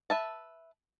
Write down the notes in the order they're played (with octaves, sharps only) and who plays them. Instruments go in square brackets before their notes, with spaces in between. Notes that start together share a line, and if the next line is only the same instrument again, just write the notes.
[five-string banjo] B4 E5 A5